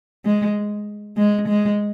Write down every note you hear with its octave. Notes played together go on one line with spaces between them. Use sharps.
G#3
G#3
G#3